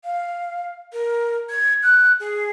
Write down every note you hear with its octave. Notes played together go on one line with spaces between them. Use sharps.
F5
A#4
G#6
F#6
G#4